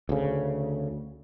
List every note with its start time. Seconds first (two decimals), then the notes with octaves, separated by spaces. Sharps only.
0.09 D2 C#3